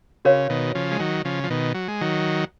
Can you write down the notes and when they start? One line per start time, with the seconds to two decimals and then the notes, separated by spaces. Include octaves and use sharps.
0.25 C#3 F#4 A#4 C#5 F5
0.50 B2 D#3
0.75 C#3 F3
0.91 G#3
0.99 D#3 F#3
1.25 C#3 F3
1.44 F3
1.50 B2 D#3
1.74 F#3
1.88 G#3
2.01 D#3 F#3